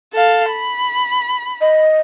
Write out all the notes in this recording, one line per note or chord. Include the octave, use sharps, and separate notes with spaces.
A4 F5
B5
D#5